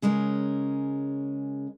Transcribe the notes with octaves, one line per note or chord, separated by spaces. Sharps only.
C#3 G#3 C#4 A#4